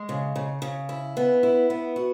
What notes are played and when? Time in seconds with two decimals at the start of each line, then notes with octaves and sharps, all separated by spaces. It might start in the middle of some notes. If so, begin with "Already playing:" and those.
Already playing: G#3
0.09 C#3
0.36 C#3
0.62 C#3
0.89 E4
1.17 B3
1.43 E4
1.70 B3
1.96 F#4